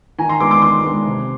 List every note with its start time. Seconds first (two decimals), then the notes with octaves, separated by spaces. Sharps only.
0.19 D#3 G#5 A#5
0.29 A#5 C6
0.40 G#3 B3 D4 C6 D6
0.51 C6 D6
0.62 D#3 C6 D6
0.83 G#3 B3 D4
1.05 C3